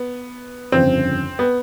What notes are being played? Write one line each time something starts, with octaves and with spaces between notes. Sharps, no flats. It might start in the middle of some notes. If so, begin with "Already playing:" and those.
Already playing: B3
G1 F2 C#3 C4
B3